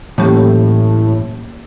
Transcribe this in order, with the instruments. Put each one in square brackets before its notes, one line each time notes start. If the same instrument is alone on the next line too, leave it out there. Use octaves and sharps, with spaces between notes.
[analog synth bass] A2 [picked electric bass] E3 F#3 [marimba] A#3 C#4 G4